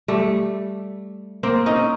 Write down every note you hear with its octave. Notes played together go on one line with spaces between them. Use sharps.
G3 A3
A#3 C4
C#4 D#4